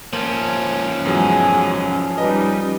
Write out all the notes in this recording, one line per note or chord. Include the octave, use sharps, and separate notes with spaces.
F3 A#3 C#4
E2 F#3 G#3 F#4 G#4
G3 D#4 B4 D#5